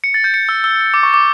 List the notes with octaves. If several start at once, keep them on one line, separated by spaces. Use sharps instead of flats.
C#7
A6
G6
C#7
E6
E6
D6
C#6
D6